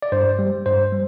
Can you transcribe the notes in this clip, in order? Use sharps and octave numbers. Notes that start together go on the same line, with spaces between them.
D5
G2 C5
G3
G2 C5
G3